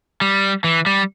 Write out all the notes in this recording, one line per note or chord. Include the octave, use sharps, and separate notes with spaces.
G3
E3
G3